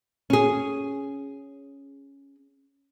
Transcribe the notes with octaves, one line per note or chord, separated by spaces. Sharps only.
C#4 G#4